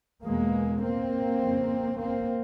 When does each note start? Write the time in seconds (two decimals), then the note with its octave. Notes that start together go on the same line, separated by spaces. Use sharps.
0.23 E2 B2 G#3 A#3
0.81 A#3 C4
1.39 F2 C#3
1.97 A#3 C4